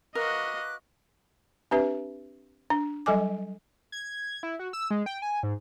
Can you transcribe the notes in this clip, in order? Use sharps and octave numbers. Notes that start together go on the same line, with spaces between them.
F#4 A#4 B4 D#5 F5 D6 F#6
C4 D4 G4 B4 E5
D4
F#3 G3 A4 D#5 G#5 D6
G#6
E4
F#4
E6
G#3
G5
G#5
G#2